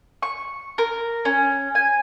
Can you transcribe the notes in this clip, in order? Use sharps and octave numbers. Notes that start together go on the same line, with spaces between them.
C#6
A#4
C#4
G#5